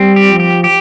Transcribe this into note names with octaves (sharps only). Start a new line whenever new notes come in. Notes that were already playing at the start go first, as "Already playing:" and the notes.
Already playing: G3 C4
G4
F3
G4
G4